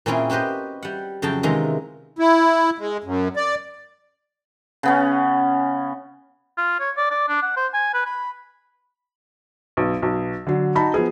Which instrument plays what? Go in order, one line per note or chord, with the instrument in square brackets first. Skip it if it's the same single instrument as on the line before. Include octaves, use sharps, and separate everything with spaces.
[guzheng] A#2 C4 C#4 E4 F4 G#4
F#4 G4 B4 C5 D#5
G3 F#5
F2 C#3 F#3 G5 A5
C3 D#3 E3 G#3 F4 A#5
[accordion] E4
G#3
F#2
D5
[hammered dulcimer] C#3 B3 C#4
[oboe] F4
C#5
D5
D5
D4
F#5
C5
G#5
B4
B5
[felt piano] B1
B1
D3 F#3
D#4 F#4 A5 B5
F3 B3 G#4